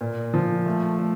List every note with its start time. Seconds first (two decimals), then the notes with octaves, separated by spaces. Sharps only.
0.01 A#2
0.34 F3
0.66 A3
0.99 A3